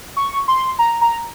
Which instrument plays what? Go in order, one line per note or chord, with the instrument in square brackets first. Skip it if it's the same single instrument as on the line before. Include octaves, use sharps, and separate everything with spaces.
[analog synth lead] C#6
C6
A#5
A#5